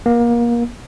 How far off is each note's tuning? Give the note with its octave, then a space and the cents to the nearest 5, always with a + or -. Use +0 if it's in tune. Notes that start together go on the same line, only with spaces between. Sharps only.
A#3 +30